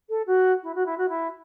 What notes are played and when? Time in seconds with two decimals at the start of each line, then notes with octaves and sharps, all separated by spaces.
0.09 A4
0.26 F#4
0.63 E4
0.75 F#4
0.85 E4
0.97 F#4
1.08 E4